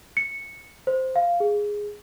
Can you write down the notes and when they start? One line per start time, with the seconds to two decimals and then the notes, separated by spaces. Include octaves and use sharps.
0.17 C#7
0.87 C5
1.16 F5
1.40 G#4